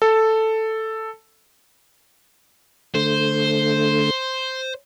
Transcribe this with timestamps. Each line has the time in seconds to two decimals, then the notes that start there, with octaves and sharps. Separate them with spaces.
0.02 A4
2.94 D3 A3 C5